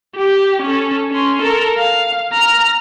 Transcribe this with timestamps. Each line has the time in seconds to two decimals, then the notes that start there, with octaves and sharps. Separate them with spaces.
0.16 G4
0.63 C#4 A4
1.11 C#4 C6
1.42 A4 A#4
1.78 F5
2.33 A#5 F6